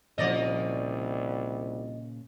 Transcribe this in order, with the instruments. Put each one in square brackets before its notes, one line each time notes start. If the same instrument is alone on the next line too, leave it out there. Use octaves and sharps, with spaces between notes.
[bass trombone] C2 [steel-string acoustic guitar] A#2 C#3 [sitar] F3 D5 D#5